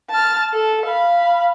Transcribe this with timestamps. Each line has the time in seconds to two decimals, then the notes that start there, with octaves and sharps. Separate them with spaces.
0.10 A5 F6
0.54 A4
0.86 F5 B5